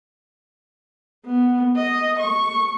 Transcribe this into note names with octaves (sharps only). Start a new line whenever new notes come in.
B3
D#5
C#6